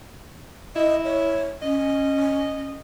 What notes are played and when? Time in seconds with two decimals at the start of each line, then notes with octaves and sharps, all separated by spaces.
0.76 E4 D#5
1.04 C#5
1.62 C#4 D#5